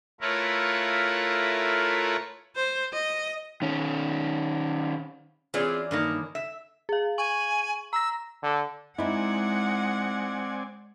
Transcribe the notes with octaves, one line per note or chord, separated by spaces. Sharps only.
A3 E4 F4 A#4 B4 C#5
C5
D#5
D#3 C#4
E3 C4 C#4 F4 G#4 D5
G2 D#3 A#3
E5
G#4 F5
G#5 C#6 F#7
A#5 E6 A#6
D3
G#3 C4 D#4 E4 D5 F#5 G#5